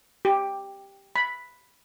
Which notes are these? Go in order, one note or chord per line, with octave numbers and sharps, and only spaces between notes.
G4
B5